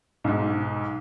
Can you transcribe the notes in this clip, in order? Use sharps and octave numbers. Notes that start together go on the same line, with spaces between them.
B1 G#2